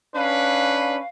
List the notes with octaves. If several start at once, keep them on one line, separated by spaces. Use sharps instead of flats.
C#4 D4 B4 F5